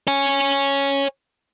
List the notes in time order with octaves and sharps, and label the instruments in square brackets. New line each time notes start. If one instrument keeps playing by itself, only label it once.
[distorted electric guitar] C#5 G#5